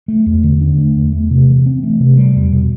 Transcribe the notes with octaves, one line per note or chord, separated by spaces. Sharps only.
A3
E2
D3
D4
A3
E2
A3
C3
E3
C4
A3
C3
G3
E2
B2